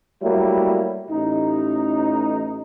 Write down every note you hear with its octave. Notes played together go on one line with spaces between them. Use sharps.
F#3 G3 A3 A#3 E4
A1 D#4